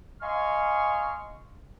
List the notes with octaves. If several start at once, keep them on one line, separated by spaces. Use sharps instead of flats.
D#5 F5 G#5 C6 C#6 F6